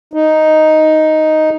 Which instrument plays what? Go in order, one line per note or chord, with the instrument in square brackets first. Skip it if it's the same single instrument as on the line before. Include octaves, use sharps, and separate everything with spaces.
[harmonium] D#4